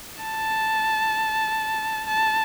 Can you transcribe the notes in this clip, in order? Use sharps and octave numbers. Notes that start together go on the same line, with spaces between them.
A5
A5